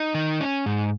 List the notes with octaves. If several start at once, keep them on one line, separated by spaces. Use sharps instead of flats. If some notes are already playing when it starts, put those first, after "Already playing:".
Already playing: D#4
D#3
C#4
G#2